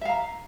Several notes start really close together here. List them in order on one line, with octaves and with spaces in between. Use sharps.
E5 F5 A#5